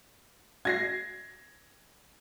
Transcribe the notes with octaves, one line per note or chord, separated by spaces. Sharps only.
G#6 A#6 C7